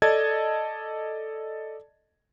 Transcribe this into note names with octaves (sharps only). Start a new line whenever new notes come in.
A4 D5 D#5 A5 G#6 A6